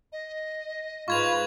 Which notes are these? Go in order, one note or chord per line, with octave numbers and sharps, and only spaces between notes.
D#5
G#2 F4 B4 B5 C#6 G#6 F7